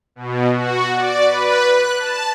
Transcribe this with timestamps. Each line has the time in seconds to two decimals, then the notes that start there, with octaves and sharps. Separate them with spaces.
0.16 B2
0.53 F#4
0.94 D5
1.25 B4
1.69 F#6
2.00 A5